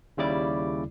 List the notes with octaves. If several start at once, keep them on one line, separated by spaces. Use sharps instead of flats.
D#2 C#3 G3 E4 D5 D6